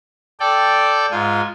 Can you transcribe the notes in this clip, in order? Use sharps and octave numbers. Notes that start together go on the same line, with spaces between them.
A4 D5 G5
G#2 F4 G#5